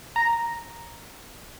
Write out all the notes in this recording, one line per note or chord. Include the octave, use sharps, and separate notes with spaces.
A#5